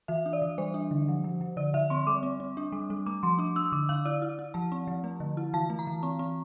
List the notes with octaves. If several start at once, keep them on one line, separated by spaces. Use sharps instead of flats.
E3 E5
D4
D5
E3
G3 C5
D4
D3
F3
F3
F3
D3 D5
D3 E5
C4 C6
G3 D6
C4
C4
D4
G3
G3
A3 D6
F3 C6
D4 D6
D4 E6
D3 D6
D3 F5
E4 D5
E4
E4
F3 A5
C4
F3
A3
D3
E4
E3 A5
A3
A#5
E3
C4
C4